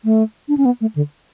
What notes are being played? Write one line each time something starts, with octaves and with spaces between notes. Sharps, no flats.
A3
D4
C#4
B3
A3
D3